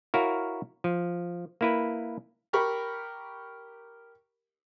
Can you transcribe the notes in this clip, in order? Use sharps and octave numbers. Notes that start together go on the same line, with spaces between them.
E4 F#4 A#4 C#5 F5
F3
A#3 E4 B4
G4 A#4 B5 C#6